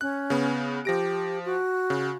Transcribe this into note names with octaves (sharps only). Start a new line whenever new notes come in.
C#4 F#6
C#3 B3
F3 G4 A#6 D7
F#4
C#3